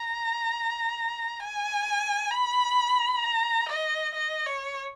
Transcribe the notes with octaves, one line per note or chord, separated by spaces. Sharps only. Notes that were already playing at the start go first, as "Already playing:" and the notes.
Already playing: A#5
G#5
B5
A#5
D#5
D#5
C#5